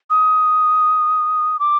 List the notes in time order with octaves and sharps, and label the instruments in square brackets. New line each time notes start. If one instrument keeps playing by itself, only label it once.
[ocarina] D#6
D6